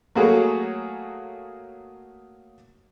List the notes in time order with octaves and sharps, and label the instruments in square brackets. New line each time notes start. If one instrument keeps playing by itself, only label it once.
[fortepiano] F#3 A3 A#3 F#4 G#4 C#5